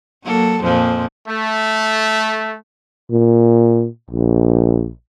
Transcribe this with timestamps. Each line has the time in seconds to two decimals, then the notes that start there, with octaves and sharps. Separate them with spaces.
0.25 F#3 A#3 A4
0.63 F2 A#2 F3
1.29 A3
3.11 A#2
4.10 A#1